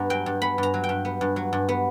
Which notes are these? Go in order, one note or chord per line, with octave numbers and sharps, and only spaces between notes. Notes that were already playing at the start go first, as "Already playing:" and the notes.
Already playing: G2 B3 A#5
F#3 G5
G2
B3 B5
G2 A#5
F#3
G5
G2
B3
G2
F#3
G2
B3